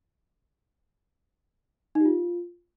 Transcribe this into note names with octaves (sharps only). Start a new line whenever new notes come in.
D#4
G4
F4